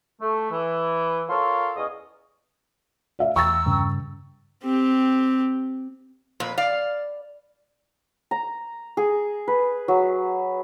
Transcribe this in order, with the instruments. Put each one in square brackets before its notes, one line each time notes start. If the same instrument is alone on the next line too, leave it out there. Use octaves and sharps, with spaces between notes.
[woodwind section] A3
E3
F4 A4 A#4 C#5 C6
E2 C#4 D#5
[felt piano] D5 E5 F5
[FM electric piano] E2 G5 A#5 [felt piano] C#6 A6 [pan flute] E6
[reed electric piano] G2 C#3
[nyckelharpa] C4 G4
[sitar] F2 B4 [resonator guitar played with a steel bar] A#2
[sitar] D5 [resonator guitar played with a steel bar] F5
[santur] A#5
G#4
B4
F#3